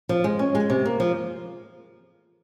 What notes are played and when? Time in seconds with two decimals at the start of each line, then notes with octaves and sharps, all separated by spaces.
0.09 F3
0.24 G#3
0.39 C#4
0.55 G#3
0.70 C3
0.86 A#3
1.00 F3